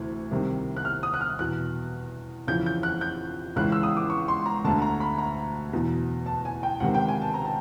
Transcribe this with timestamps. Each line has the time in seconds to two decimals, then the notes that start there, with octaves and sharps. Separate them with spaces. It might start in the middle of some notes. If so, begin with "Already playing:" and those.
Already playing: D2 C3 E3
0.31 C2 C3 D#3
0.77 F#6
0.85 F6
1.03 D#6
1.14 F#6
1.21 F6
1.39 E2 B2 F#6
2.47 F2 C#3 E3 G6
2.66 G6
2.83 F#6
3.01 G6
3.56 C#2 C#3 E3 F#6
3.72 E6
3.83 D#6
3.97 D6
4.10 C#6
4.28 C6
4.46 A#5
4.64 D2 D3 A5
4.82 A#5
5.00 B5
5.18 A#5
5.73 E2 B2
6.26 A5
6.45 G#5
6.63 G5
6.80 C#2 C3 D#3 F#5
6.95 G5
7.08 G#5
7.21 A5
7.34 A#5
7.45 A5